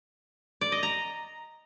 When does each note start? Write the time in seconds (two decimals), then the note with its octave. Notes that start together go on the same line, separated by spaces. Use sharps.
0.61 D5
0.72 D#5
0.83 A#5